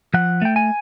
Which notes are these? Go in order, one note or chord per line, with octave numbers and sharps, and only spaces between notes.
F3 F#5
A3 G5
G#5